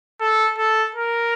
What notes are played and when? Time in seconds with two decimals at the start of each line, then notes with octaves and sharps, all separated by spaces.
0.21 A4
0.58 A4
0.95 A#4